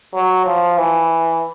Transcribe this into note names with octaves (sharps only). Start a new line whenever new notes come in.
F#3
F3
E3